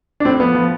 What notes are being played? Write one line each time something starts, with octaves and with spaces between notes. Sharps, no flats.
D4
A2 C4
F3 B3
F3